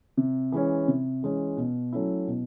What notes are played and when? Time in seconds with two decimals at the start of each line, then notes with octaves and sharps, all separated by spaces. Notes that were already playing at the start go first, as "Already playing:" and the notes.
0.17 C3
0.52 E3 G#3 C#4
0.88 C3
1.23 E3 G#3 C#4
1.57 B2
1.93 F#3 A3 C#4 E4
2.27 B2